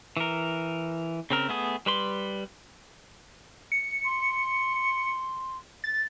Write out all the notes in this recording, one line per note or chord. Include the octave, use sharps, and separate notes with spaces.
E3 A#4
C#3 C4 A#4
A3 B3 G#4
G3 B4 C6
C#7
C6
A6